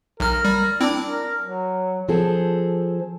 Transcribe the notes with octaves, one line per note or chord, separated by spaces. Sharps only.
B1 A#4 F6
G3
C4 D4 E4
A#4
F#3
F3 C4 G#4 A4